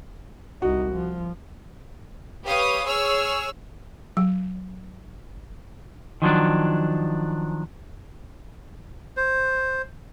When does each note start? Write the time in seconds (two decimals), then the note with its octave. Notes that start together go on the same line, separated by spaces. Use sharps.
0.62 C2 D#4 F#4
0.92 F3
2.45 G4 B4 C#5 F5 D#6
2.84 G#4 C#5 E6 F6
4.17 F#3
6.22 D#3 F3 F#3 D4
9.17 C5